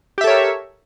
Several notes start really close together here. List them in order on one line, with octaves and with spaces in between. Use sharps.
G4 E5 A4 C#5 A#4